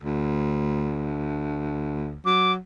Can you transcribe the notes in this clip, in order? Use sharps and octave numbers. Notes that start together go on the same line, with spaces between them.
D2
F#3 D6